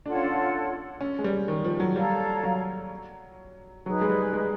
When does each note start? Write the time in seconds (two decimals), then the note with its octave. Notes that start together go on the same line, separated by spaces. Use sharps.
0.06 D4 F4 A4 C#5 F#5
0.15 C#4
0.24 D4
1.01 C#4
1.19 G#3
1.24 G3
1.48 D#3
1.64 F3
1.80 F#3
1.96 G3 A4 C#5 F5 A#5
2.43 F#3
3.86 F#3 D#4 G#4 B4
4.01 G#3
4.09 G3
4.33 G#3